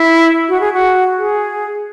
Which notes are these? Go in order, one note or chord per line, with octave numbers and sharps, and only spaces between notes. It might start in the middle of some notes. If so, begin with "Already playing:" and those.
Already playing: E4
F#4
G#4
F#4
G#4